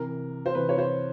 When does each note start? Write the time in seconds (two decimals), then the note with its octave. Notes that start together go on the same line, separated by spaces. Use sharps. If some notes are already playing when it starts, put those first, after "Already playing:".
Already playing: C3 E3 A#4
0.46 C5
0.55 C3 E3 B4
0.69 C#5
0.78 C5